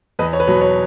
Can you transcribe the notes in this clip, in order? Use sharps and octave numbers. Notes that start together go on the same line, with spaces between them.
E2 B4 D#5
C#5
B4
B2 F#3 B3 C#5
C#5